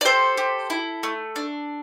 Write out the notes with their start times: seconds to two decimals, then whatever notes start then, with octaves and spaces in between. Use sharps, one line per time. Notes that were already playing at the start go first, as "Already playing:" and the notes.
0.01 D5
0.05 G4 A4 C5
0.37 G4
0.70 E4
1.03 A3
1.36 D4